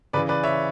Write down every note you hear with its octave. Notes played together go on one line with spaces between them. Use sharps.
C#3 E3 B4 D5
B4 D5
C#5 E5